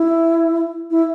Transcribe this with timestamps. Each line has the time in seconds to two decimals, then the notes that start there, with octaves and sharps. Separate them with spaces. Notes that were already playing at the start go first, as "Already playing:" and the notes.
Already playing: E4
0.91 E4